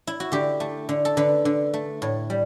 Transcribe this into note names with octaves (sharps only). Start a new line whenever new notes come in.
E4
F#4
D3 G4
A3
D3
A4
D3 B4
D3
A3
A2
G3